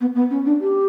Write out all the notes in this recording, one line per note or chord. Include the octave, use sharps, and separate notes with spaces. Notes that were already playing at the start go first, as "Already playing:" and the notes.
B3
B3
C#4
D4
G4